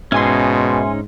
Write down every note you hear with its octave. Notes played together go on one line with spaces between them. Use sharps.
G#2 B2 C#4 D#4 E5 G#5 C6